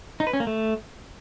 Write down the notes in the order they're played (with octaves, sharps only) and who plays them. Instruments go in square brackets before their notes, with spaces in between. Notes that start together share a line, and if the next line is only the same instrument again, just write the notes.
[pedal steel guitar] D#4
B4
C#4
A#3
A3